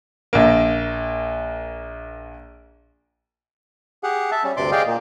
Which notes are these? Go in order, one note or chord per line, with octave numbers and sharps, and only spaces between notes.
A#1 A#3
G4 G#4 F#5
E5 A5
G3 C#4
D2 G2 C3 D5 C6 D6
G4 G#4 D5 D#5 F5 G5
A#2 A#3